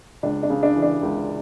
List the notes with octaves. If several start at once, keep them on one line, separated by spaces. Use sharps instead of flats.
C#2 D4
D4
C#3
D4
E3
D4
C#2